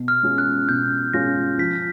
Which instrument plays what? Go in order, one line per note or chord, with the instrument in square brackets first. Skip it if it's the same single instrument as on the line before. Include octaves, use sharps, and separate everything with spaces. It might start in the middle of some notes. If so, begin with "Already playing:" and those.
Already playing: [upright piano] B2
[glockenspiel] F6
[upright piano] G#3 C#4 F4
[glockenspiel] F#6
[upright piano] B2 [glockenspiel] G6
[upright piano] G#3 C#4 F4 [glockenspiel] A#6
[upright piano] F3 [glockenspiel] B6